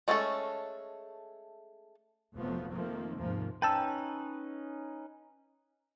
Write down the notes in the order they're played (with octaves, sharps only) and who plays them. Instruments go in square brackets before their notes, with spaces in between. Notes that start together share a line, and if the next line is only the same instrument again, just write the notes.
[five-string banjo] G#3 A3 C#4 F4 A4
[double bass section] F1 F2 F3 F#3 A3 B3
D#3 F3 A3 A#3 C4
D#2 G#2 C3 F3 A#3
[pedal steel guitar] C#4 D#4 B4 [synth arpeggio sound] G5 A5 E6